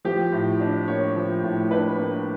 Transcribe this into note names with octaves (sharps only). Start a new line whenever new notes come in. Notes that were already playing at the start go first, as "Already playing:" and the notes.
F3 G4
A2
D4
A#3 C#5
F3
A2
D4 B4
A#3